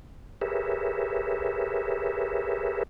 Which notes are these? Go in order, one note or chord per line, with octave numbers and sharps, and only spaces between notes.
G4 G#4 A#4 B4 C#5 E5